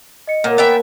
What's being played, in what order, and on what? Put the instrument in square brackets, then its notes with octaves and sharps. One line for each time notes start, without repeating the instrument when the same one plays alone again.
[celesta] D#5 C#7
[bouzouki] A#2 [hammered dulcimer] A#3 [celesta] A#4 C#5 F#5
[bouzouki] B3 E5 G5 [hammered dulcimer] G#5